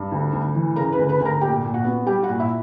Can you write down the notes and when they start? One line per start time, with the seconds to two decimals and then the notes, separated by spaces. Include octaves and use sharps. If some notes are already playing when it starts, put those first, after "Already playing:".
Already playing: G2
0.12 D2
0.33 D2
0.55 E3
0.76 C#3 A#4 A#5
0.92 B4 B5
0.98 D2
1.09 B4 B5
1.20 D2
1.25 A#4 A#5
1.41 A#2 G4 G5
1.64 A#2
1.74 F#4 F#5
1.84 B3
2.06 G3 G4 G5
2.23 F#4 F#5
2.29 A#2
2.39 E4 E5